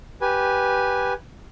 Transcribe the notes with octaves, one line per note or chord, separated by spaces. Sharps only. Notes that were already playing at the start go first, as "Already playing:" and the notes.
G4 B4 G#5